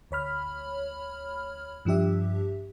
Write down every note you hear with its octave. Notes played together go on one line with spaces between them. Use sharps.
D2 C#5 B5 F6
G2 F3 D4 G4 E5